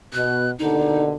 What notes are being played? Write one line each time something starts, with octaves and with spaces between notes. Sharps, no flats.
B2 F#6
D#2 B2 D3 D#4